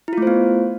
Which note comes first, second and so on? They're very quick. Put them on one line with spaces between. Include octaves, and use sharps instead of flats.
E4 F4 A3 C5 B3